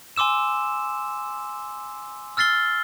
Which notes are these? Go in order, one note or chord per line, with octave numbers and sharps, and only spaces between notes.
G#5 C6 D6 E6 E7
E6 F6 A6 C7 G7